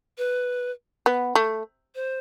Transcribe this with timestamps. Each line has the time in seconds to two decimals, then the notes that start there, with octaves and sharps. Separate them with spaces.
0.18 B4
1.06 B3
1.35 A3
1.95 C5